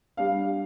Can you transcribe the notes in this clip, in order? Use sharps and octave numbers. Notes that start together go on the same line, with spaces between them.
G3 D4 F5